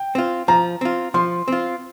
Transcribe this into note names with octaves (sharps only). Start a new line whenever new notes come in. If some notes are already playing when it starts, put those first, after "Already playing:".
Already playing: G5
C4 F4
F3 A#5
C4 F4
F3 C6
C4 F4